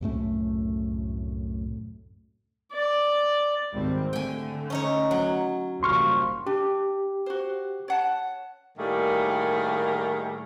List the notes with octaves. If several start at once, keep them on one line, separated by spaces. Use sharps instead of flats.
C2 F#2 A2 A3
D5
G#1 G3 C4
D3 A3 G5 G#5
C#4 D#4 C#5
F#3
F#1 F3 G3 C6 C#6 F6
D4 G4
F#4 C5
C#5 F#5 A5
A2 D#3 G3 A3 A#3 G#4